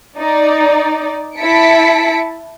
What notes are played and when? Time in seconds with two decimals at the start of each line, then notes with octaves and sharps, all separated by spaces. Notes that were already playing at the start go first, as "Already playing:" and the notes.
0.18 D#4 D5
1.37 E4 A5 B6 C#7 D7